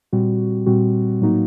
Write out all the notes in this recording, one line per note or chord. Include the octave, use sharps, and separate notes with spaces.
A#2 G3 C4 F#4
A#2 G3 C4 F#4
A2 F#3 A#3 D#4 F#4